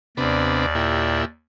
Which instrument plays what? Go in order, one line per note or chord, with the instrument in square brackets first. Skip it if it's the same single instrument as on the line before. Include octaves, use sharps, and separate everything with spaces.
[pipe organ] D#2 D5 [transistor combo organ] C3 B3 D4
[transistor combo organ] A#2 E4 G4